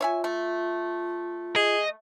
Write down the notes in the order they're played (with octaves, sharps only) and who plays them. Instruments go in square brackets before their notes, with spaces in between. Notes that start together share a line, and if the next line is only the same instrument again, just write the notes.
[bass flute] F4 [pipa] C#5 E5 G#5
[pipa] A3
[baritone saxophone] G#4 [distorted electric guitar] D#5